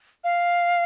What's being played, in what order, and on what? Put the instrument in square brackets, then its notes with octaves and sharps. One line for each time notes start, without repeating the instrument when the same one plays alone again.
[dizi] F5